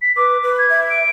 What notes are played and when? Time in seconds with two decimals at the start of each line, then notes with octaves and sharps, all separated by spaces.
0.02 B6
0.17 B4 D6
0.43 B4
0.58 G#6
0.70 E5
0.90 D7